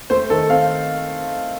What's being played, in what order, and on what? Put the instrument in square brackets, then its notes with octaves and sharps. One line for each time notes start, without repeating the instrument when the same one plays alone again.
[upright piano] A3 C5
D#3 A4
C4 F5